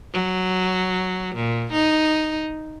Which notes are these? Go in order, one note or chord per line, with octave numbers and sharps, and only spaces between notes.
F#3
A#2
D#4